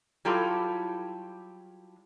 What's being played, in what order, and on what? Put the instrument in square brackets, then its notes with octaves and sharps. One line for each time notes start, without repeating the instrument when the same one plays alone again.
[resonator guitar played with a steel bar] F#3 G3 E4 F4 G4 A4